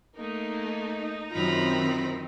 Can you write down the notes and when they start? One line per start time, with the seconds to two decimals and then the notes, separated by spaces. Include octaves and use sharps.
0.16 A3 A#3 D#4
1.32 F#2 D#3 C4 F4 A#5 B5